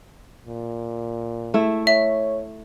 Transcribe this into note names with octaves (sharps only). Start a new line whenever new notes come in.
A#2
A3 E4
C#5 E5